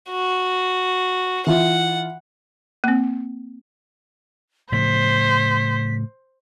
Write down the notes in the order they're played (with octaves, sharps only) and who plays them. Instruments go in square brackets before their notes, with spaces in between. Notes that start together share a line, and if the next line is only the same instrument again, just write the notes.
[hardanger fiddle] F#4
[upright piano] E3 F4 [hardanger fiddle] F#5
[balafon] A#3 C4
[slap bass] A2 C#3 F3 [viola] C5 [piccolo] B6